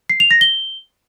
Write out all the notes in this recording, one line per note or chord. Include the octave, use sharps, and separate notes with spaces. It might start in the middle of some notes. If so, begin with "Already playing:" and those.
C7
F7
A#6
G7